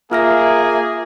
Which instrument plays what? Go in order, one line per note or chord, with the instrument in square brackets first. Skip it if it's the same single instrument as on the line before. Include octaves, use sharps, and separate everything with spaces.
[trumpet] A#3 [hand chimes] F4 F6 A#6 [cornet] G#4 [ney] E5